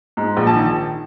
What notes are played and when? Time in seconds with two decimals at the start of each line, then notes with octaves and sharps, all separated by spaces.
0.17 G#2
0.37 A#1
0.47 A5
0.56 D#3